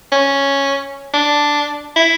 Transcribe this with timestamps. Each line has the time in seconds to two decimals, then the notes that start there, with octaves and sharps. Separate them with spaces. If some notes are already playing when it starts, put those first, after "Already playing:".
0.12 C#4
1.14 D4
1.96 E4